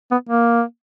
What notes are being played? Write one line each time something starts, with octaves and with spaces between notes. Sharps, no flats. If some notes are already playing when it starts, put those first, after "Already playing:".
B3
A#3